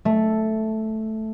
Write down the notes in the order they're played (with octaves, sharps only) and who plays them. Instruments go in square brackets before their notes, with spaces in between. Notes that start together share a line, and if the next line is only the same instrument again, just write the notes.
[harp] A3